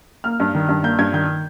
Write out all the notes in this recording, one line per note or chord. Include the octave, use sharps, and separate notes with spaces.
A#3 F6
G2
D#3
G2
A#3 G6
G2 G#6
D#3 G6